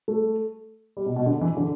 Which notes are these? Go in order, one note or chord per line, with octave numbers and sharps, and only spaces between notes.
A3
G3
B2
B2
D3
E3
D3